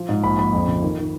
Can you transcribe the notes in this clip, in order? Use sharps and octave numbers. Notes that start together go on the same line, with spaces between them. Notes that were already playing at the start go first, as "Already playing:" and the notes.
Already playing: F3
G#2
A#1 B5
A#1 B5
F2
C#3
D#3
D#3